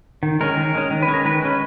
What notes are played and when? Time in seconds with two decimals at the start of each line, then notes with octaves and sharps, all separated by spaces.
0.23 D#3
0.41 G#3 C#4 A#4
0.57 D#3
0.75 G#3 C#4
0.90 D#3
1.03 B4
1.08 G#3 C#4
1.14 A#4
1.25 D#3 B4
1.42 G#3 C#4